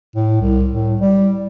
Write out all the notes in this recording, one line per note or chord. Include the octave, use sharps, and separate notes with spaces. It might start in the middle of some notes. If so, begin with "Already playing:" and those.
A2
C2
A2
G3